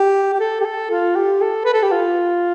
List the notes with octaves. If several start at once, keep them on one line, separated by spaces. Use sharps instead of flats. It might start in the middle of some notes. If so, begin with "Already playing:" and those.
Already playing: G4
G4
A4
G4
A4
F4
G4
A4
B4
A4
G4
F4